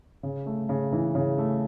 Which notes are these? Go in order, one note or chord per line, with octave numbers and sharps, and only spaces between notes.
C#3
A3
C#3
E3
C#3
A3